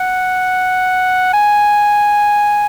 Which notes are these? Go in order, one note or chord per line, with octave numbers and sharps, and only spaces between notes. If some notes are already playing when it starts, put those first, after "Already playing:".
Already playing: F#5
G#5